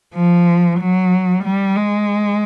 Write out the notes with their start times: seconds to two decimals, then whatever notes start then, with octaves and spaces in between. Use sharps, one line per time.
0.15 F3
0.80 F#3
1.44 G3
1.77 G#3